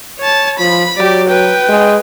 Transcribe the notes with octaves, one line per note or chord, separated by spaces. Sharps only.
C#5 A5
F3 B5
F#3 G4 D5
B4 G5
G#3